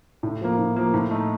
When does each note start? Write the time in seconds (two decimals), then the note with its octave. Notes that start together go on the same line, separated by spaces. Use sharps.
0.23 A2
0.41 F3 A#3
0.59 A2
0.76 F3 A#3
0.94 A2
1.11 A3 D#4